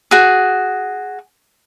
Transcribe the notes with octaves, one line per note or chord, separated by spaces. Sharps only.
F#4 G#4